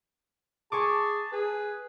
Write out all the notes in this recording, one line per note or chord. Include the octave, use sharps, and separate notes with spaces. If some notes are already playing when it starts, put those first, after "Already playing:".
G#4 G#5 A5 C#6 D6
G#4 B4